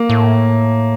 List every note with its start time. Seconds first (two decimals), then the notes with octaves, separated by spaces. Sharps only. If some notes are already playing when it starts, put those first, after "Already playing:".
Already playing: A#3
0.09 A2